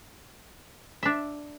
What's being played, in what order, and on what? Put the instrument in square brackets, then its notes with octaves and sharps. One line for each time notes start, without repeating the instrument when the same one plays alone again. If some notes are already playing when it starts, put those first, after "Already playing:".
[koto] D4 E5